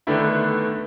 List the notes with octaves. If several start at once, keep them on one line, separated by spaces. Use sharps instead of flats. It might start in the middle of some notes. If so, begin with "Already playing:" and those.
D3 D#3 A3 B3 D4 E4